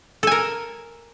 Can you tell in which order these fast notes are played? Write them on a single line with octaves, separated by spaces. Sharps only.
A4 G#5 A#4